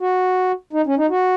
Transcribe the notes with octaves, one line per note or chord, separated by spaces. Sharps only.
F#4
D#4
C#4
D#4
F#4